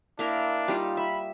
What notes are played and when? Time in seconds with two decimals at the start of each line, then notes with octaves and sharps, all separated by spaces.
0.19 A#3 D4 E4 A#4
0.68 G3 D#4 F4
0.97 E5 B5